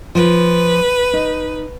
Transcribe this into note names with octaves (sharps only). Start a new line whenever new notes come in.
F3 B4
D#4